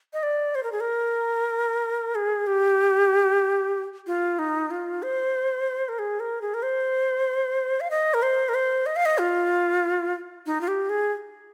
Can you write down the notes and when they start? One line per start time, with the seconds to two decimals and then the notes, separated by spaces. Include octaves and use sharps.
0.13 D#5
0.23 D5
0.55 C5
0.63 A#4
0.72 G#4
0.80 A#4
2.15 G#4
2.47 G4
4.07 F4
4.39 D#4
4.71 F4
5.03 C5
5.89 A#4
5.99 G#4
6.20 A#4
6.42 G#4
6.54 A#4
6.63 C5
7.80 F5
7.91 D#5
8.14 A#4
8.22 C5
8.49 A#4
8.54 C5
8.86 D#5
8.96 F5
9.05 D#5
9.18 F4
10.46 D#4
10.61 F4
10.68 G4
10.89 G#4